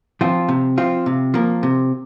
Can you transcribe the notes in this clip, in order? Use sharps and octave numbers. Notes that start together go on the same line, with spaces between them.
F3 C4 F4
C3
F3 C4 F4
C3
F3 A#3
C3